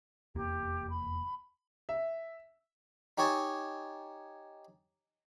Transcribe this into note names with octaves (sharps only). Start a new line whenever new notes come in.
F1 E2 A#3 G4
B5
E5
D#4 G4 C#5 D#5 G#5 A5